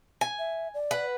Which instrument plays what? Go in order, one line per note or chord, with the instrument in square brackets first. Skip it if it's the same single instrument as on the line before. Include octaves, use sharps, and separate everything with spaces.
[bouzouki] G#5
[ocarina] E5
D5
[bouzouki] B4 F#5